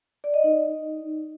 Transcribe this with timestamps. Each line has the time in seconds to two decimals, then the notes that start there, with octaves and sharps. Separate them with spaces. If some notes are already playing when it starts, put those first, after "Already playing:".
0.24 D5
0.34 D#5
0.44 D#4